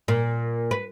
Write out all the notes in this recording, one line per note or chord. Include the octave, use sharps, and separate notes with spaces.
A#2
B4